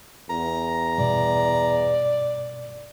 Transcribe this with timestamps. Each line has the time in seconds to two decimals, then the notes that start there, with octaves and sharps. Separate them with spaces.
0.30 E2 A#5
0.98 G2 B2 D5